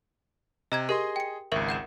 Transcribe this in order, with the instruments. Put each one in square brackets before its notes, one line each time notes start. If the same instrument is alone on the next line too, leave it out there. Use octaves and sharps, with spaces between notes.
[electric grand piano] C3 [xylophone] D#5 A#5 G#6
[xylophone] G4 A#4 [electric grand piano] G#4 D#5 C6
[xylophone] G5 C#7
[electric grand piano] G#1 C#2 [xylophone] A#4 E5 C#6
[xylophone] F#5 G6 E7